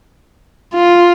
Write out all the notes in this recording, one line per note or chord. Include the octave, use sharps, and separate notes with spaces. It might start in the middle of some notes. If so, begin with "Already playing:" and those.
F4